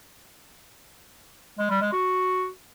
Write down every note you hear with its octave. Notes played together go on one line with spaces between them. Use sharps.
G#3
G3
G#3
F#4